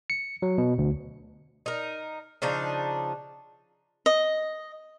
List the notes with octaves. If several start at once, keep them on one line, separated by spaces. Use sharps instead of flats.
C#7
F#3
B2
D2
D#4 A#4
C#3 F3 D4 D#4
D#5